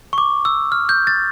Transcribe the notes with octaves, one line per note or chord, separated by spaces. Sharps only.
C#6
D6
E6
F6
G6
A6